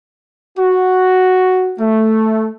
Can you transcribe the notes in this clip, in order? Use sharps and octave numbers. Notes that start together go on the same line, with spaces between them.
F#4
A3